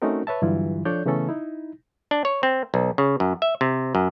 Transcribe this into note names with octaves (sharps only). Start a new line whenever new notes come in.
A3 C4 C#4 D#4 F#4 A#4
B4 C#5 E5 A5
G2 D3 E3 F#3 E4 F4
F3 D4 A4 C#5 D5 G6
C#3 E3 A3 B3 C#4 A4
D#4 E4
D4
C#5
C4
B1
C#3
F#2
E5
C3
F#2